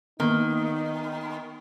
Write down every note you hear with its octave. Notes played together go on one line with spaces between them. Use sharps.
D#3 A#3 B3 D#4